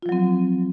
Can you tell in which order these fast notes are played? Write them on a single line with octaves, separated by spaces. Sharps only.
F4 F3 F#3 C4